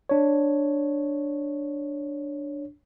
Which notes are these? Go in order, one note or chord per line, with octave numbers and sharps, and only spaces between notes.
D4 C#5